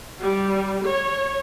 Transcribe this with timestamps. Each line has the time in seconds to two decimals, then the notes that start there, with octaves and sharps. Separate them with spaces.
0.23 G3
0.86 C#5